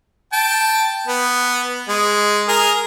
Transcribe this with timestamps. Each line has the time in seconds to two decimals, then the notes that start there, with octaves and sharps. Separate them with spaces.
0.33 G5 A5
1.07 B3
1.89 G#3
2.48 G#4 A#4